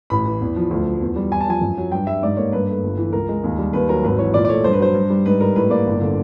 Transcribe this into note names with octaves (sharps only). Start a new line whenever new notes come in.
A1 B5
E3
E2
F3
D2
F3
E2
G3
E2 G#5
A5
F3 G#5
F#2
F#3
G2 G5
G3 E5
G#2 D5
A#3 C#5
G2 B4
A3
G1
E3
C#2 A#4
G#3
D#2
G3
D#2 B4
F#3 A#4
G#1 B4
E3 C#5
A#2 D5
D5
A3 C#5
G2 C5
B4
F#3 C5
G2
G3
G#2 B4
G3 A#4
A2 B4
A#3 D5
G1
D3